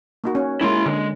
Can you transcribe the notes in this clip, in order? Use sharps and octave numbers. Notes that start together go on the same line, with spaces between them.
A#3 D#4 F#4
C#4
G#3 A#3 C#4 E4 C6
D3 G#3